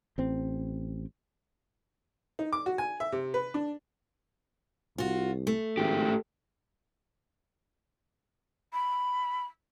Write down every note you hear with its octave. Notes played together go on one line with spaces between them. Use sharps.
A1 C4
D#4
D6
F#4
G#5
E5
C3
B4
D4
C2 F4 F#4
A3
G#1 A2 G4
B5